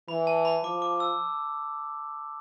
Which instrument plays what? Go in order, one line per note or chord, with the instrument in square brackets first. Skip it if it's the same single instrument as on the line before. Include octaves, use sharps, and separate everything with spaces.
[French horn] E3 [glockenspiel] B5
[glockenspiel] A5
B5
[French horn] F3 [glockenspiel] D6
[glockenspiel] D6
E6